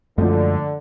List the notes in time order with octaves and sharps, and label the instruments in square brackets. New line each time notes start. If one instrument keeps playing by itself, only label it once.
[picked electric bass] F#2 G#3 [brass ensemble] D3 [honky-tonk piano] F3 A3